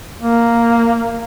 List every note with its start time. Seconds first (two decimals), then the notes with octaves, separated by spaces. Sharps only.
0.21 A#3